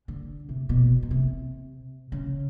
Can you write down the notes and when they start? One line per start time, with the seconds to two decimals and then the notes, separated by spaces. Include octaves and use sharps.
0.08 D3
0.49 C3
0.69 B2
1.03 B2
1.11 C3
2.12 C#3